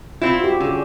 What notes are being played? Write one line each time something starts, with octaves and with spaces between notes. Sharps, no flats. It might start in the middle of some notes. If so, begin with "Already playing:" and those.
C4 E4 F4
F#4 G4
D3 C#4 G#4